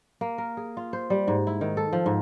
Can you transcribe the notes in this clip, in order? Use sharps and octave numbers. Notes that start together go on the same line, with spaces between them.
A#3
A#4
G#4
F4
C5
G3
G#2
E4
D#3
A4
F3
G#2